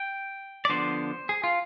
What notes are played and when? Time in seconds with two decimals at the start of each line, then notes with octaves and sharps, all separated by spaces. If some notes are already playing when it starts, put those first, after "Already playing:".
Already playing: G5
0.65 D5
0.69 D3 F3 B3 D4 C5
1.29 G#4
1.44 F4